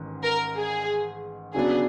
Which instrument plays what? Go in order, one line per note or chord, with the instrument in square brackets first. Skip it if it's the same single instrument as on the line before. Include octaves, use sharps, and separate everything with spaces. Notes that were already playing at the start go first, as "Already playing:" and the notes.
Already playing: [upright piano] A1 G#2 D#3
[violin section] A#4
G#4
[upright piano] C#3 F#3 B3 D4 [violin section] G#4